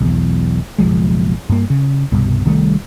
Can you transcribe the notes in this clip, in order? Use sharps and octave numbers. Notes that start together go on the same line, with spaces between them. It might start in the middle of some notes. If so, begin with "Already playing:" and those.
B1 E2
F#1 B1 F3 G#3
G2 A#3
C#3
C2 G2 B2
C2 D#3 G3 A3